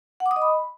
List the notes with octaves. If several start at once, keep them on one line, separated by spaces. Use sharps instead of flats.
F#5
D6
D#6
D#5
B5